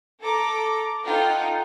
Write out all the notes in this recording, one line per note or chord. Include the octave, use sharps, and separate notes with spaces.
A4 A#5 D6
D#4 F4 A4 F#5 G5